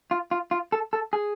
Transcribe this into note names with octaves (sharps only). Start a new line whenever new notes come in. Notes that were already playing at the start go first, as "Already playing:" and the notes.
F4
F4
F4
A4
A4
G#4